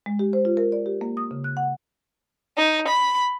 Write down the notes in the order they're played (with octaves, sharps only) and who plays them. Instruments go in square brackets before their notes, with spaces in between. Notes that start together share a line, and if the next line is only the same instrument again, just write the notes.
[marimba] G#3
G4
C5
F4
A#4
D5
G4
A#3
D#6
C#3
F#6
F#5
[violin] D#4
B5